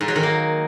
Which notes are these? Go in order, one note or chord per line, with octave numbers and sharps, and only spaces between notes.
G#2
F#3
D#3
A#3